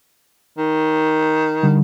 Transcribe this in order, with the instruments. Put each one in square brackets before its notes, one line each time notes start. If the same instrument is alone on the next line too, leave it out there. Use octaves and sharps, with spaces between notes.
[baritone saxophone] D#3
[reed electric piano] D3 G3